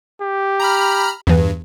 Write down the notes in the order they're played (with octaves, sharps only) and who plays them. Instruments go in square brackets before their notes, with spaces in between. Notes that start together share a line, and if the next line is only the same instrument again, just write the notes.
[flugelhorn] G4
[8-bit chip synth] A#5 B5 F6
[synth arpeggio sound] E2 E3 [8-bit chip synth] G2